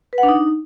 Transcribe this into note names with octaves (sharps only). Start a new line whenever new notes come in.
B4
F#5
D4
D#4